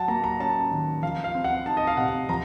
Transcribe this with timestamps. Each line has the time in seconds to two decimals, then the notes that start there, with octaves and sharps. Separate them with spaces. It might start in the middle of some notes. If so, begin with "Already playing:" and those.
Already playing: F#3 F#5 A5
0.08 A#3 A#5
0.24 A#5
0.40 C#4 A5
0.71 D#3
1.03 F3 F5
1.24 F5
1.35 C4
1.44 F#5
1.66 D#4 A5
1.77 D#5
1.87 F5
1.97 C3 F#5
2.29 F3 A#5